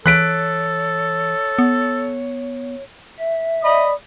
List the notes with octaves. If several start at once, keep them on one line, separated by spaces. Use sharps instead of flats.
E3 A4 C#5 F#6 B6 D7
B3
E5
D5 D#5 B5 D#6